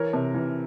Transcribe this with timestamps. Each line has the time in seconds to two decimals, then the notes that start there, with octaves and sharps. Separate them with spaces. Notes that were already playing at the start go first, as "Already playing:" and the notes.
Already playing: E3 A#4 C#5
0.13 C3
0.34 E3